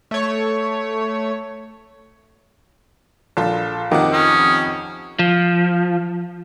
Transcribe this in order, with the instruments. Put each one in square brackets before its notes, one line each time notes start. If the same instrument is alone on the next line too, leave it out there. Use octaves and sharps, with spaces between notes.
[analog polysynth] A3 C#5
[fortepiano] A#1 [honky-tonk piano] F4 A4 A5
[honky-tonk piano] F2 C3 F#5 [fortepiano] D#3 [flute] D6
[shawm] C#4 [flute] D#6
[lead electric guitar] F3